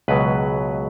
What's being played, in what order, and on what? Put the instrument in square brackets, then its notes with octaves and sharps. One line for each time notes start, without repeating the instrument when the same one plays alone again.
[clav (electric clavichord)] C#2 B2 F#3 B4